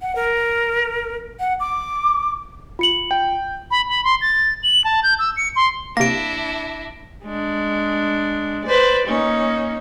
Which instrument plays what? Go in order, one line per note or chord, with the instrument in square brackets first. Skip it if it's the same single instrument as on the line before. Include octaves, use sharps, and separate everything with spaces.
[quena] F#5
A#4
F#5
D6
[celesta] F4 C#7 F#7
[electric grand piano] G5
[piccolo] B5
B5
C6
A6
F#7
A5
G6
E6
C#7
C6
[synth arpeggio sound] C3 A#3 [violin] D4 E4 [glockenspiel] A#6 D7
[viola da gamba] G#3 D4
B4 C5 D5
A#3 C#4 D#4